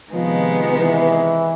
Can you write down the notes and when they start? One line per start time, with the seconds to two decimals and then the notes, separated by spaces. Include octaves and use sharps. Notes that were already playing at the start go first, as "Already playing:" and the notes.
0.13 C3 D#3 F3 G#3 B3
0.79 E3